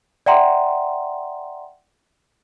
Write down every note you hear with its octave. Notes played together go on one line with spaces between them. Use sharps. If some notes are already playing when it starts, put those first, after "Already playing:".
D5 E5 F#5 G5 A#5 C6